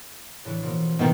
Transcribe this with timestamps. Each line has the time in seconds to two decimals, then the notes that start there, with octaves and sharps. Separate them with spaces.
0.45 A2 D3 E3
0.62 B2 F3 A#3
0.99 B2 D#3 A#4